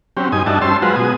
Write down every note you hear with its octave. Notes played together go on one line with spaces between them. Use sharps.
F#3 C4 C#4 G4
G2 D#4 G#5 D#6
G2 D4 D#4 F#4 E5 A5
G3 C#4 C5 A5 C6 E6
F#3 G#3 F4 F#4 B4 C5
B2 G#4 D#6